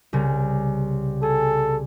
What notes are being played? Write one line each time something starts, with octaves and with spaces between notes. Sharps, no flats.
C2 C#3
G#4 A4